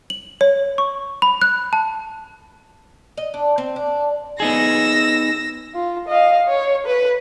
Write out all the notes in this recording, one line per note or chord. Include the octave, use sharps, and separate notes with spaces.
F#7
C#5
C#6
B5
F#6
A5
D#5
D4
C4
D4
B3 D#4 G#4 E6 A#6
F4
D#5 F5
C#5
B4